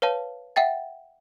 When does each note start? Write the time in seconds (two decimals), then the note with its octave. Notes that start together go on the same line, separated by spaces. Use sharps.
0.02 B4 C#5 F5 A5
0.56 E5 F#5 G5 A6